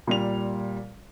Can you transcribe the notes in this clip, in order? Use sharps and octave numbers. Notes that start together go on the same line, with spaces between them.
A#2 G3 F7